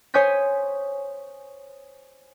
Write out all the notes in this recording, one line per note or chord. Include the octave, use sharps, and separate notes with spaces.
C5 C#5 G#5 D#6 G6 B6